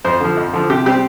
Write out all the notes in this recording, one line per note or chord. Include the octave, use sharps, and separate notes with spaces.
F2 C5
D3 F3
F2
D3 F3
C3 G4
G3 C4 G4